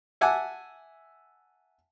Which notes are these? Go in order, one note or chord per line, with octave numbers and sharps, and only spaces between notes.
E5 F#5 G#5 A5 D6